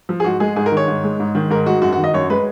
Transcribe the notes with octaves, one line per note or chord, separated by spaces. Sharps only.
F3
G#4
G#2 F#4
G#3 G#4
G#2 G#4
A#4
D#3 C#5
G#2
G#3
G#2
D#3
G#2 A#4
G#3 F#4
F#2 F#4
F#4
D#3
D#5
F#2 C#5
G#3 B4